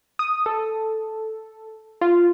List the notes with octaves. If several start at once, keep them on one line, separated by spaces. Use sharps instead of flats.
D#6
A4
F4